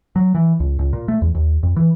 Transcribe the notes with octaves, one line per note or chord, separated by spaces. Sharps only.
F#3
E3
C#2
C#2
A#2
A3
E2
D#2
F2
E3